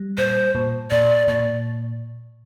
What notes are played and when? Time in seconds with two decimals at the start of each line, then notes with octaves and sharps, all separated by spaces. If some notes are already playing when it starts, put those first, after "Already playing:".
Already playing: G3
0.18 A#2 C5
0.55 A#2
0.91 A#2 D5
1.28 A#2 D5